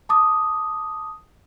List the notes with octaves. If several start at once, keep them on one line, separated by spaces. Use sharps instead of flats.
A5 D6 D#6